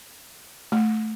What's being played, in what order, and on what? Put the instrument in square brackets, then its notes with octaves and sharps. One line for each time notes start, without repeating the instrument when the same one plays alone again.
[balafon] A3